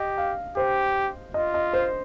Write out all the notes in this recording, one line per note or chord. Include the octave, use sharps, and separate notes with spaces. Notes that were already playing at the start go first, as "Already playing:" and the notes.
Already playing: G4 D#5
F5
G4 C5
F4 D#5
D#5
C5